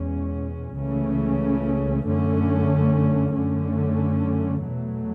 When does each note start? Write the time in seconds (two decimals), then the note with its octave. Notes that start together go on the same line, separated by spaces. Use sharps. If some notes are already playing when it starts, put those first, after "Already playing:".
Already playing: E2 B2 G#3 C#4
0.75 C#2 C#3 E3 A3 C#4
2.04 F#2 D3 A3 C#4
3.33 F#2 D3 A3 C#4
4.61 E2 B2 F#3 A3